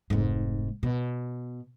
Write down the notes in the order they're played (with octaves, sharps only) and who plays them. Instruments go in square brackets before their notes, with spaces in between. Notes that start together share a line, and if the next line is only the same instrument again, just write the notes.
[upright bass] F1 G#2
B2